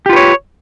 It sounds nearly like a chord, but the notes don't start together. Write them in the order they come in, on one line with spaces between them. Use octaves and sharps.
G4 F4 B4 C#5